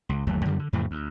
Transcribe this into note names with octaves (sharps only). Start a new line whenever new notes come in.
C#2
G1 D#2 F#3 A3
F#2 D3 D#3 G3
D3
F2 A2 C#3 E3
D2